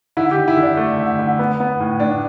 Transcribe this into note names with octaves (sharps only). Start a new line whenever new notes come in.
D3 E4
G4
D3
E4
D3
D4
A3
D3
D3
B3
B3
A2
A2 D4